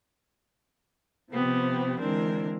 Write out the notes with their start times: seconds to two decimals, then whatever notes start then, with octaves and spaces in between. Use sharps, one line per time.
1.33 C3 F3 B3 C4 G4
1.99 D3 E3 G#3 C4 D4 A#4